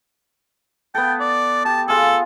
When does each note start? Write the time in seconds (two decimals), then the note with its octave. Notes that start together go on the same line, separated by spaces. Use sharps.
0.95 B3 A4 G5
1.20 D5
1.65 G4 A5
1.88 F4 G#4 A4